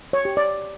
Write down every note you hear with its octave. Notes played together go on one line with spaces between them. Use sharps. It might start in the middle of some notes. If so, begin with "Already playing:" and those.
C#5
G4
D5